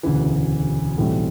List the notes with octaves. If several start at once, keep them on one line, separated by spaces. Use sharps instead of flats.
E1 D2 C#3 E3
B1 A2 E3 G3 C4